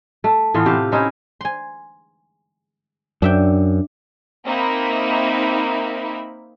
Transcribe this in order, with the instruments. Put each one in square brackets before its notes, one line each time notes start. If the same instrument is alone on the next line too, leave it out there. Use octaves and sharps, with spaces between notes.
[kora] A3
A2 E3 B3 F4
C3 C4 G4 F5
C#4 D#4 E4 C5
[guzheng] G#5 C6
[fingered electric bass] F#2 [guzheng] D4 E5 G5
[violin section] A#3 C4 D#4 A#4 E5 B5